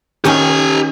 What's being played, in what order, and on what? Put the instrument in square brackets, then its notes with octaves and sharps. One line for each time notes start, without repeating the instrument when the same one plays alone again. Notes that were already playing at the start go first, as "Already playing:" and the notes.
[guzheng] D#3 C#4 D#4 [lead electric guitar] G4 G#5